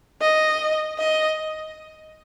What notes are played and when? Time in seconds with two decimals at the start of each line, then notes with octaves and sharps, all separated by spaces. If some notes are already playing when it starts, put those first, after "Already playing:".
0.21 D#5
0.99 D#5